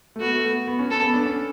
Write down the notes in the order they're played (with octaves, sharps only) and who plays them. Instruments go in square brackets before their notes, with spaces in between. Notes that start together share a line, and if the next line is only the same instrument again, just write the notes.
[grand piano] A3
[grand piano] B3 [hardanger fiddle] F#4
[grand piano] A3
B3
B3
C#4
[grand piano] B3 [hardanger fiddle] A4
[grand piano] B3
D4
C#4